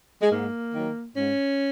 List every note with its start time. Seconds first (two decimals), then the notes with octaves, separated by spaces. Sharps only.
0.21 G#3
0.31 G#2 A#3
0.74 D#3 F#3
1.17 G#2 C#4